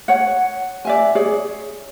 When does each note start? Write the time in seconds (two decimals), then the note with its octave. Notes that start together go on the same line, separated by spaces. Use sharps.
0.08 C#5 F#5
0.85 D5 E5 G#5
1.15 G#4 C#5 D5